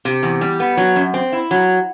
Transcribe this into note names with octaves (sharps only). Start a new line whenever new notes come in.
C3
E2
G3
B3
F#3
F#2
C4
E4
F#3